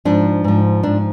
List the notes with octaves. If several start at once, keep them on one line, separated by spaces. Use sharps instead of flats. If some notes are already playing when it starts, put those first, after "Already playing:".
G#2 F3 D4
G#2 F3
G#2 F3 D4